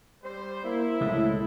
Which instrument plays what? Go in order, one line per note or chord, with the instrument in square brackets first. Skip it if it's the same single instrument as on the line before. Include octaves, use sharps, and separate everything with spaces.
[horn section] G3 C5
[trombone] A#3 [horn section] E4
[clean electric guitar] C#2 G#3 A3 [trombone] A2